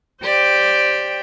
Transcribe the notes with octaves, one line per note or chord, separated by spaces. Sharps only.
G4 C5 D5 G5